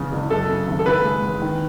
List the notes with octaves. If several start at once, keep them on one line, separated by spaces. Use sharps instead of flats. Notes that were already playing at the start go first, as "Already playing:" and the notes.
Already playing: E2 G#2 C#3
F#1
F#2 A4
C#3
G#1
A4
C#3 B4
G#3
E2
D#3